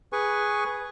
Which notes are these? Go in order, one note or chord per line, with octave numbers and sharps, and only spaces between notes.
G#4 B4 G#5 C#6